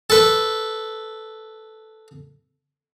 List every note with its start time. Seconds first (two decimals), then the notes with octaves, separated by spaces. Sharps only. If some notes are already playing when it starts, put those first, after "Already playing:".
0.10 A4 B4